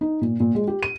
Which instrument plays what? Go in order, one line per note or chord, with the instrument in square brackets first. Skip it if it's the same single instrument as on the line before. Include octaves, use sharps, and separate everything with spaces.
[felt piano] D#4
A#2
A#2
G#3
G4
D#7